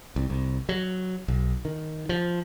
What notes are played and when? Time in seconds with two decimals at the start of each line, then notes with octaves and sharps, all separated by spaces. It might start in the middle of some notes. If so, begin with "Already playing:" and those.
0.16 C2
0.30 C2
0.69 F#3
1.28 B1
1.65 D#3
2.09 F3